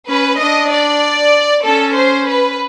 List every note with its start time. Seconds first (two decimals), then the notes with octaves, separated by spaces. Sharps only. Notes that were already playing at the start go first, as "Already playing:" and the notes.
0.08 C#4 B4
0.39 D4 D#5
0.72 D5
1.64 C#4 A4
1.97 C5
2.28 B4